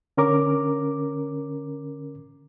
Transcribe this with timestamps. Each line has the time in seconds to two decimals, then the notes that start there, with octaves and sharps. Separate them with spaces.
0.17 D3 C#4 A#4 D6